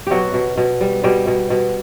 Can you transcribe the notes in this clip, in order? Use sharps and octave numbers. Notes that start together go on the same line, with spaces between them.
B2 F#3 F#4 G4
B2
B2
G3
B2 G3 G4
B2
B2